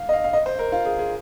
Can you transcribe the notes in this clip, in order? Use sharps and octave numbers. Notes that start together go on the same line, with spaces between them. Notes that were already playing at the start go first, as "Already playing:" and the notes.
Already playing: F5
D#5
F5
F5
D#5
C5
A#4
F4
G#4
G#4